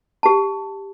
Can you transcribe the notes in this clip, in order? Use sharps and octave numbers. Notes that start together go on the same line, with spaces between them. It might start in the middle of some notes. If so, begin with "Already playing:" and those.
G4 A5